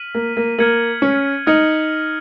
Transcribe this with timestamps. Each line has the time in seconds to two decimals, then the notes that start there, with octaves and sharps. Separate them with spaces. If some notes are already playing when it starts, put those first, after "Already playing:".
Already playing: F6 B6 D#7 F#7
0.15 A#3
0.37 A#3
0.58 A#3 F6 G#6 C#7 F#7
1.02 C#4
1.47 D#4 F6 G#6 C#7 F#7